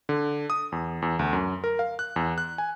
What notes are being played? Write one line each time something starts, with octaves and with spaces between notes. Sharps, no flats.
D3
D#6
E2
E2
D2
F#2
A#4
F5
F#6
E2
F#6
G#5